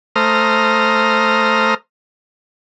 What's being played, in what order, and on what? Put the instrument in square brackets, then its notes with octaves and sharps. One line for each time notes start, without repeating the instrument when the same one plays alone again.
[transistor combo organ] A3 C5 A#5 D#6 F6